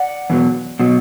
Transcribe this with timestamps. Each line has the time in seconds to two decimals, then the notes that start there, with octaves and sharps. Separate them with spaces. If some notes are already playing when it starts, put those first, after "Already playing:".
Already playing: D5 F#5
0.30 E2 B2 F#3
0.79 B2 F#3